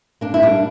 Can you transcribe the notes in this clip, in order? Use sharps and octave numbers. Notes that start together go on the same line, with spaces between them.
A#3 D4
E4
G3 D4